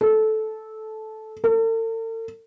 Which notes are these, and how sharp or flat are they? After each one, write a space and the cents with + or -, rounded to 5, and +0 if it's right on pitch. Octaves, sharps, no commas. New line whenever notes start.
A4 -15
A4 +45